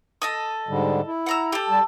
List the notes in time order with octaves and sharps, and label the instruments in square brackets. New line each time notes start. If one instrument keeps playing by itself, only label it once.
[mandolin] A4 D#5 D#6
[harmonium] G#2 D3 G3
E4
[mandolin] F#5 A#5 E6
G4 A4
[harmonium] G3 A5